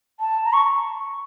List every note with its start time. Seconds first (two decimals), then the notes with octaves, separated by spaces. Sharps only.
0.20 A5
0.45 A#5
0.53 C#6